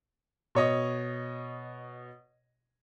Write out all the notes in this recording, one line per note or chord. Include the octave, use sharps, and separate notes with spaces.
B2 C#5 D#5